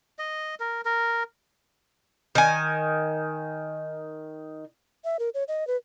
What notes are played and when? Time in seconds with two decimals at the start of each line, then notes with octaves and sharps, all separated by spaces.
0.19 D#5
0.60 A#4
0.85 A#4
2.35 D#3 G#5
5.05 E5
5.19 A#4
5.34 C#5
5.48 D#5
5.67 B4